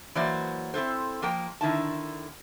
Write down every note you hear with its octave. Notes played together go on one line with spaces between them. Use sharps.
E3 F#3 A#3 C5 D5
C4 E4 A4 C5
F3 A#3 A#4 G5
D3 D#3 E4 A5